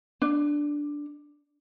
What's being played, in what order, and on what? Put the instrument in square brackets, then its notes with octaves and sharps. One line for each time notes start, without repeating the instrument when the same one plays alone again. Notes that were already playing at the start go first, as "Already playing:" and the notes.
[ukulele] D4